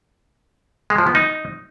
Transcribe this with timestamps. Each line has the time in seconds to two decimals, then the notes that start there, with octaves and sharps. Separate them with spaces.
0.90 G#3
0.98 F3
1.07 B3
1.15 D#4